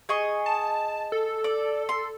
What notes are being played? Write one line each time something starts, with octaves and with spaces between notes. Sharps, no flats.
G#4 D#5 C#6
A5
A4
D5
C6